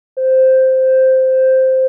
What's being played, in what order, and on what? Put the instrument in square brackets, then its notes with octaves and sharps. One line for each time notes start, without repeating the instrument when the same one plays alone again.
[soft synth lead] C5